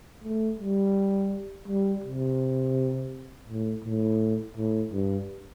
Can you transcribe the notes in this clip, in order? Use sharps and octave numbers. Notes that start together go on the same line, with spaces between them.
A3
G3
G3
C3
A2
A2
A2
G2